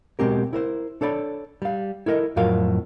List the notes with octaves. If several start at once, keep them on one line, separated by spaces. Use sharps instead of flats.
B2 G#3 C4 G4 A#4
E4 A#4 C5
D4 A4 C#5 D5 B5
G3 F5
E4 A4 A#4 D#5
F2 A2 F#3 F4 A#4 F5